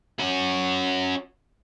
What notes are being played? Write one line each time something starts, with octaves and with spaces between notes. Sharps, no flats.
C#4 F#4